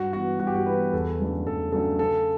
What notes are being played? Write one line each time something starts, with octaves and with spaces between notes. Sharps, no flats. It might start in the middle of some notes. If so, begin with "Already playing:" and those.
Already playing: G2 F#4
E3 B3 F#4
G2 F#4
G4
F#4
E3 B3 B4
E2 A4
C#3 F#3 A3 D4
E2 A4
C#3 F#3 A3 D4 A4
C#3 A4